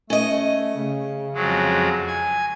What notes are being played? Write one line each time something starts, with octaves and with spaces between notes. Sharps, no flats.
A3 C#4 D#5
C#3
F2 F#3 G#3
G#5